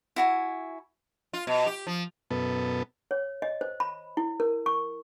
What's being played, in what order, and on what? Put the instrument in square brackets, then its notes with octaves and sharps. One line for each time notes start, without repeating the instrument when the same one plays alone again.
[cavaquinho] E4 F#4 G#5
[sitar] F4
B2
G4
F3
[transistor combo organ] F#2 B2 B3 A4
[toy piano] C#5
D#5
C5
B5
E4
A#4
C#6